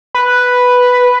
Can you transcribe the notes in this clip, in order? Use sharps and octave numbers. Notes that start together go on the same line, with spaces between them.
B4